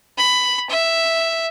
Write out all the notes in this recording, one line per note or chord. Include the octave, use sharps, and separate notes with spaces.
B5
E5